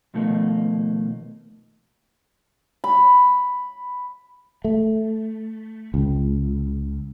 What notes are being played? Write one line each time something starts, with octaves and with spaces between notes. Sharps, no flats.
B2 D#3 F3 A3 A#3
B5
A3
C#2